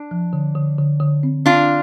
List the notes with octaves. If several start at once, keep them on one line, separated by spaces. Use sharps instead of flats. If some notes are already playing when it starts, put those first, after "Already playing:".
Already playing: D4
F3
D3
D3
D3
D3
C4
C4 D4 F4